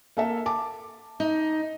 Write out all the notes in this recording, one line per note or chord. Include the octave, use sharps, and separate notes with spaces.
A#3 A4 E5
A5 D6
D#4